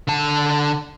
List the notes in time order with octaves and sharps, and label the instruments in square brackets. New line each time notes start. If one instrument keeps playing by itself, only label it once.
[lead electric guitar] D3 A5